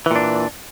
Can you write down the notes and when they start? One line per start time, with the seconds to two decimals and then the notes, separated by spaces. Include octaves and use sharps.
0.06 E3
0.11 A#2
0.15 D4